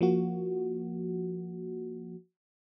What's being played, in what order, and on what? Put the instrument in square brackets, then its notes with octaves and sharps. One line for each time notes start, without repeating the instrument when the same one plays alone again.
[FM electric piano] F3 A#3 F#4